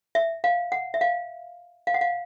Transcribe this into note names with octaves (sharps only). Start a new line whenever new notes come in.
E5
F5
F#5
E5
F5
F5
F#5
F5